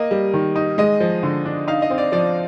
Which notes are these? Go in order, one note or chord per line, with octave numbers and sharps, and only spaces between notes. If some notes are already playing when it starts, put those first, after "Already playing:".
Already playing: A#3 D#5
G3
D#3
D#4
G#3 D#5
F3
D3
D4
D#4 F5
D#5
C4
D5
F3 D5